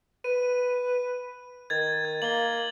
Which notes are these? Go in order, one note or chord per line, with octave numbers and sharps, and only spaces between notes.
B4 D#7
D#3 G#6 A6
G#6
A#3 F#7 G7